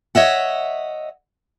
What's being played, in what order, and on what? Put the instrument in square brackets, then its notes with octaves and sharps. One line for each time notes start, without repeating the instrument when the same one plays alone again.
[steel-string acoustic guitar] C#5 D#5 E5 F#5